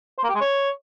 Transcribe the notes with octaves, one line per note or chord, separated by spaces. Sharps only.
C5
A#3
G4
G#3
C#5